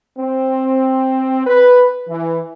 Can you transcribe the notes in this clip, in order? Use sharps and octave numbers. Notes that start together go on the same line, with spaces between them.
C4
B4
E3